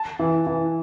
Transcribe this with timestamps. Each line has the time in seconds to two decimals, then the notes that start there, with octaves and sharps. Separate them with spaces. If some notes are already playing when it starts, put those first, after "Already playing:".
Already playing: A5
0.19 E3
0.47 E3